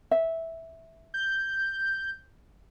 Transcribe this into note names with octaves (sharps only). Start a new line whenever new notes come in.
E5
G6